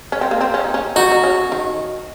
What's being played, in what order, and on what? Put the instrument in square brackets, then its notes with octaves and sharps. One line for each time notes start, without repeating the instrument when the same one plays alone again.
[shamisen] C#4
C4
A#3
C4
C#4
D#4
C#4
[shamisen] D#4 [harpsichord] F#4
[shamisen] D#4
C#4
D#3